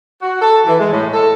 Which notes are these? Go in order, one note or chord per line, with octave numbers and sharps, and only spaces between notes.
F#4
A4
E3
G#3
A2
A4